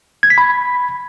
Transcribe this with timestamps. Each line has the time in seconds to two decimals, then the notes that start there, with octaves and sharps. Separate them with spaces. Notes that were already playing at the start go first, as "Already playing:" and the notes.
0.23 G#6
0.30 B6
0.38 B5